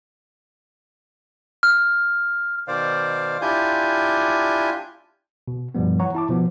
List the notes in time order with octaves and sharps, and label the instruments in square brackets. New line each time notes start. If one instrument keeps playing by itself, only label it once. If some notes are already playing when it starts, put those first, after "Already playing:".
[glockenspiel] F6
[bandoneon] B2 D#3 C5 D5 F5
D4 E4 F4 G4 G#5 G6
[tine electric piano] B2
G2 B2 F3 G3 B3
E3 C#5 F#5 A#5 C#6
E4 A5 D6
B2 F3 B3